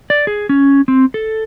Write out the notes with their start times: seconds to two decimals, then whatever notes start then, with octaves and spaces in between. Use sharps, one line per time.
0.10 D5
0.27 G#4
0.49 C#4
0.88 C4
1.14 A4